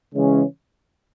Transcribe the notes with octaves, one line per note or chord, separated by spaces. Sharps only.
C#3 E3 G#3 C#4